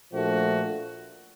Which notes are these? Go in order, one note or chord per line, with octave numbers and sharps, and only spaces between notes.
A#2 F3 A3 D4 F#4